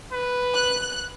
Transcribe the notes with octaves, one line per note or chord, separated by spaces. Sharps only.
B4
F#6